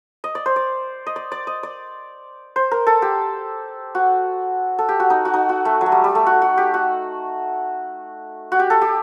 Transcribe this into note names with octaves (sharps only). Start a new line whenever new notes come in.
D#5
D5
C5
D5
D#5
D5
D5
D#5
D5
C5
A#4
A4
G4
F#4
A4
G4
F#4
D#4
F#4
D#4
F#4
A3
F#3
A3
G3
G3
A3
F#4
F#4
G4
F#4
F#4
G4
A4
G4